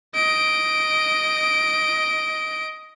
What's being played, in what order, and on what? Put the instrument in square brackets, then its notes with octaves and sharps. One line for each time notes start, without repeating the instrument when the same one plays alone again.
[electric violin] D#5 D7